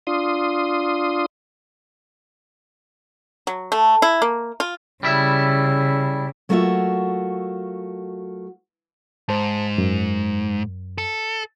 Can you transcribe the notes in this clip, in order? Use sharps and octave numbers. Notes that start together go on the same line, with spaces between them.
D4 F4 C6 D#6
F#3
A3
E4
A#3
F4
C#3 G3 E4 E5
F#3 A3 A#3 F4 F#4 E5
G#2 C5 A5
F#2
A4